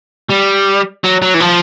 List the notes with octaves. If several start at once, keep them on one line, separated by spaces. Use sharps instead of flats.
G3
F#3
F#3
E3
F3